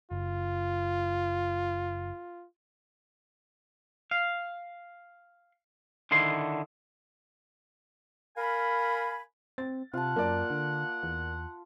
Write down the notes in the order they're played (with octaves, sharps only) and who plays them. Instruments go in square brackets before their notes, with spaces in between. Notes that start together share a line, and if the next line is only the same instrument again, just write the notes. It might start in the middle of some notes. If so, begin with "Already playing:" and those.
[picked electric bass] F#1 [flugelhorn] F4
[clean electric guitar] F5
D3 D#3 E4 C6
[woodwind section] A#4 F5 G#5 B5
[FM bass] C4 [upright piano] A6
[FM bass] C3 [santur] F4 A5 [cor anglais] F#5
[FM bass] F#2 [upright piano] A#3 D5
[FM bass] D3
E2